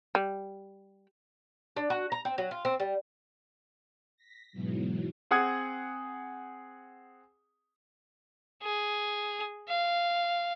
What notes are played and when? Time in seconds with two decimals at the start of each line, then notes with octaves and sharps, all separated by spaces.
0.15 G3
1.76 D4
1.90 F#4
2.12 A#5
2.25 C4
2.38 F#3
2.51 F4
2.65 C4
2.80 G3
4.17 A#6 B6
4.53 G#2 B2 E3 F#3
5.31 C4 G#4 F#5 D#6 G#6
8.63 G#4
9.68 F5